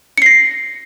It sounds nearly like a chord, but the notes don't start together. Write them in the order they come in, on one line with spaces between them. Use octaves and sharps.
C#7 C7 A#6